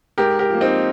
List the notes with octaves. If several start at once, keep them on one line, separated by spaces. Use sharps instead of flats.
G#2 G4 A#4
G4 A#4
F3 A#3
C4 D#4